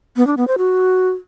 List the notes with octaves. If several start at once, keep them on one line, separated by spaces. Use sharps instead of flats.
B3
D4
B3
C5
F#4